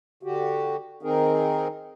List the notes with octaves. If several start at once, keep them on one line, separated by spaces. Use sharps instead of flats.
D3 F#4 G4
D#3 C4 D#4 G#4 A#4